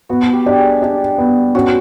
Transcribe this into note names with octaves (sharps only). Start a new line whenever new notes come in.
B3 F#4
G4
D4 G4
G#4
D4 G4
B3
C#4 F#4